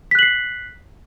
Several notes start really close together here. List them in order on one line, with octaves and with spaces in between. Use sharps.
B6 F#6 F#7 C7